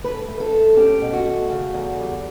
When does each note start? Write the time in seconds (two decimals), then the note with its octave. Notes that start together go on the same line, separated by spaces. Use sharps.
0.04 A3 B4
0.28 A3
0.40 A4
0.52 A3
0.77 C#4 G4
1.02 B2
1.13 F#4
1.26 A3
1.50 C#3
1.74 E2
1.99 G3